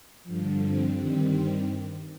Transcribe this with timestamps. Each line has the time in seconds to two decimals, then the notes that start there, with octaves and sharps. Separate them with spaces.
0.24 G2 D3 F3
0.60 C4
0.96 G2 D#3 G3 C4